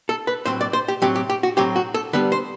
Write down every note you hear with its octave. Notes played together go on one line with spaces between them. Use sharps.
A4
B4
A2 F#3 C4 C5
D5
C5
G4
A2 F#3 C4 G4
G4
G4
F#4
A2 F#3 C4 G4
F#4
A4
D3 G3 B3 D4 B4
C5